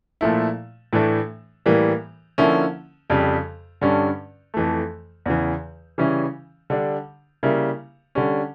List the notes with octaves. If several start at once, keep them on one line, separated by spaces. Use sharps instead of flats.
A#2 F3 A3 E4
A2 E3 A3 D4
A2 E3 G3 A#3
D3 F3 A#3 C#4 E4
F2 C#3 G3
G2 D3 G3 C#4
F2 E3 A3
E2 C#3 E3
C#3 E3 G3 C#4 E4
D3 G3 D4
C#3 G3 A#3 E4
D3 G3 C#4